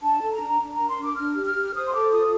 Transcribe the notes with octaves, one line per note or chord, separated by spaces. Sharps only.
D4 A5
A4
A#5
D4
D4
A#4 A#5
C6
D4 D6
D4 F6
G4
F6
G4
C5 D#6
C6
A4 D6
F4 D#6